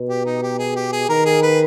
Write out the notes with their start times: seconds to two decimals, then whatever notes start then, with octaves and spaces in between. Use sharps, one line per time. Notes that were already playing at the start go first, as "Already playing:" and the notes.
Already playing: B2
0.09 G4
0.25 D#4
0.43 G4
0.58 G#4
0.76 G4
0.92 G#4
1.09 D#3 A#4
1.25 G#4
1.42 B4